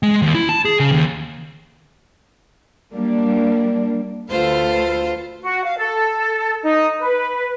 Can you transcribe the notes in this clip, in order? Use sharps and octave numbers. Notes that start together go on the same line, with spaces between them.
G#3
D#2
E4
A5
G#4
C#3
D#2
G3 A#3 D4
D2 F4 A4 B4 C5 F5
F#4
F5
A4
D#4
B4